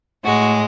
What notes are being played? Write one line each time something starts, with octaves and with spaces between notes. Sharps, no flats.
A2 G#3 F#4